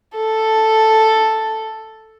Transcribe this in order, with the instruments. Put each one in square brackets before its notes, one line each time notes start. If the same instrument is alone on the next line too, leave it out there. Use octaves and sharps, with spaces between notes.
[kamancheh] A4